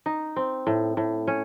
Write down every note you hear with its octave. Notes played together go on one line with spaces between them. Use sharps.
D#4
C4
A2
A2
C#4